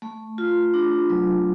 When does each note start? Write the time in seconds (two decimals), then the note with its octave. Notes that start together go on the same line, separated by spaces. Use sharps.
0.02 A3
0.38 F4
0.74 D4
1.10 F#3